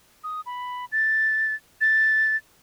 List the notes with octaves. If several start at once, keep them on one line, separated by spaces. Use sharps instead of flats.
D#6
B5
A6
A6